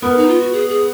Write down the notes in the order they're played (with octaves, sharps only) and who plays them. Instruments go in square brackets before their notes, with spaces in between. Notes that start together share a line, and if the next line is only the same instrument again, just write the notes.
[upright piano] B3 [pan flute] A#4
[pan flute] D#4
F4
F#4
G#4
G#4